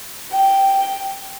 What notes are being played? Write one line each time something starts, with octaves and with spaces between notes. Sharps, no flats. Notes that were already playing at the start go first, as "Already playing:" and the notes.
G5